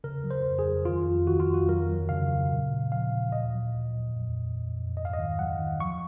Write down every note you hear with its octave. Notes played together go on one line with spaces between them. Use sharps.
C#3 A#4
F#3
C5
F2
G#4
F2
D#3 F4
F2
D#3 F#4
F4
F2
F#4
F#3 A#4
F#3
C#3 F5
C#3
A#2
A#2
F3 F5
A#2
A#2 D#5
F#3
A#2
A#2
F2
F2
F2
F2
G#2 D#5
F5
D#5
D#3
F#3 F#5
D#3
F3 C#6